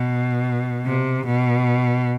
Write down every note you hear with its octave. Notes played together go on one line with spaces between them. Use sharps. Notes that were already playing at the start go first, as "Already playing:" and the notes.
Already playing: B2
C3
B2